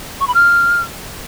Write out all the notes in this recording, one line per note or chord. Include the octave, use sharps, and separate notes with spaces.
C#6
B5
F6